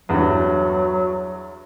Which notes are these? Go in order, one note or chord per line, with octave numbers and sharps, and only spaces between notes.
E2 G2 F#3